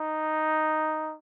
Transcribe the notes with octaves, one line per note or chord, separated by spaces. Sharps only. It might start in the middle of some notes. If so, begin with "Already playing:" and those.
Already playing: D#4